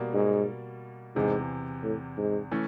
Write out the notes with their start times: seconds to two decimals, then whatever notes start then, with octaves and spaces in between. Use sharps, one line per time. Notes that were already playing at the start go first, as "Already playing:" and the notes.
Already playing: B2 G3 A#3
0.14 G#2
1.16 E2 G#2 C3 E3
1.83 A2
2.18 G#2
2.51 E3 A3 C#4